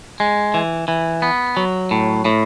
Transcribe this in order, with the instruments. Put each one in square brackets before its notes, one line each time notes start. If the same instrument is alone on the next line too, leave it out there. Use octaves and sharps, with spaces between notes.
[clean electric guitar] G#3
E3
E3
B3
F#3
A2
A2